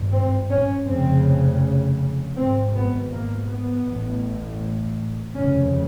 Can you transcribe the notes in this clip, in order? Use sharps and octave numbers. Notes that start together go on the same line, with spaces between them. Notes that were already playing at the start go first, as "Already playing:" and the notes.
Already playing: G#1 G2
C4
C#4
F1 F2 C#3 C4
G#1 G#2 C4
B3
A#3
B3
A1 A2
F1 D#2 C#3 C#4